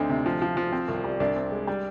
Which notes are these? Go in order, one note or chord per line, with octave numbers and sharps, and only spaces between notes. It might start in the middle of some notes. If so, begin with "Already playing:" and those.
Already playing: D2 C4 D#4
C3
F3
F3
F3
C4
C2
G3
C2 D4
C4
G#3
G3